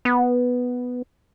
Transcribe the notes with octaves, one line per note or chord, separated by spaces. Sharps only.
B3